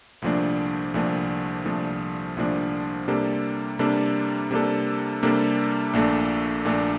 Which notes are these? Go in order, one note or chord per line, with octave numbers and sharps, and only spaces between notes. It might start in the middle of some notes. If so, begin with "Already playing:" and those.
C2 A#2 F3 A3 D4
C2 A#2 F3 A3 D4
C2 A#2 F3 A3 D4
C2 A#2 F3 A3 D4
C3 G3 A#3 D4 A4
C3 G3 A#3 D4 A4
C3 G3 A#3 D4 A4
C3 G3 A#3 D4 A4
A#1 A#2 A3 D4 A4
A#1 A#2 A3 D4 A4